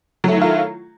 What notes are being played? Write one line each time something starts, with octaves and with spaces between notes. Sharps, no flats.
D#3 F#3 A3 E4 F4